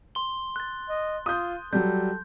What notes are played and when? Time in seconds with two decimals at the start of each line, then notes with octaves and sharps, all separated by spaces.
0.15 C6 G7
0.56 F#6 A6
0.89 D#5
1.26 F4 D#6 G6
1.73 F#3 G3 A4 G6